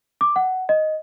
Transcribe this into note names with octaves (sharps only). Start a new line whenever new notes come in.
D6
F#5
D#5